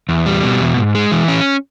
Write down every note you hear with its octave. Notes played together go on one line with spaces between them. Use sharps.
E2
G3
B2
E2
G#2
G#3
E3
C#4